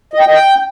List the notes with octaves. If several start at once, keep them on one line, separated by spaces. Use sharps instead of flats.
D#5
G5
D#5
G5